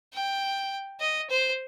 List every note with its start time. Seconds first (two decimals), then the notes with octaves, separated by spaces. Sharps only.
0.13 G5
1.00 D#5
1.30 C5